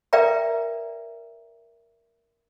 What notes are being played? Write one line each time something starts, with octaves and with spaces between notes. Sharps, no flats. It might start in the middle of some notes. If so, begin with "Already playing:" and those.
A#4 B4 D5 E5 G5 A#5